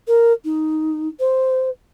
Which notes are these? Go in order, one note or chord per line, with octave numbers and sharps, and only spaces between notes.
A#4
D#4
C5